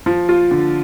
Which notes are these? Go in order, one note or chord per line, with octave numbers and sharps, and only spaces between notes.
F3
F4
D3